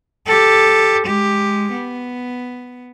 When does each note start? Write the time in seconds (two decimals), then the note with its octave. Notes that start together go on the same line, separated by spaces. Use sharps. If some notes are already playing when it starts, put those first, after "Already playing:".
0.27 G4 A4
1.06 G#3 G4
1.72 B3